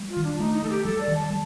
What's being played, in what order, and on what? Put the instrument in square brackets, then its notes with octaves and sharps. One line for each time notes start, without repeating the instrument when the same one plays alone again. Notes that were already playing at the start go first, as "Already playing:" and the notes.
Already playing: [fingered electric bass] G3
[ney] F4
[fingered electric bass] D#3
[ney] D4
[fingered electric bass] A3 [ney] D#4
[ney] D#4
[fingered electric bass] A3 [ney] A4
[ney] G4
[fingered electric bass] G3 [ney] A4
[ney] D5
[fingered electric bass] D#3
[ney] A5
[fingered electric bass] G3